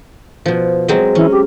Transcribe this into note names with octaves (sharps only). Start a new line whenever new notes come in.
B2 F3
F#3 G#3 C4
E3 C#4
G4